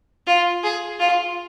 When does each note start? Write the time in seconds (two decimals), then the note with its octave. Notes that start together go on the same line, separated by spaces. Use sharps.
0.27 F4
0.64 G#4
0.99 F4